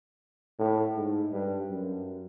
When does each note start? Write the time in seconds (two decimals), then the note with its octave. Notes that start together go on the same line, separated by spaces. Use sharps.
0.59 A2
0.96 G#2
1.32 G2
1.70 F#2